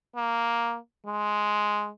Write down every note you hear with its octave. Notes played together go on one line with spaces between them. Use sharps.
A#3
G#3